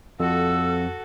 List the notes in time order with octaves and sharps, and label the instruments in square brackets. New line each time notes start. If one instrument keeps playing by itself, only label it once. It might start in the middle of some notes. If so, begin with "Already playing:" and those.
[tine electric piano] F2 [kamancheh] F#4 A4 [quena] E6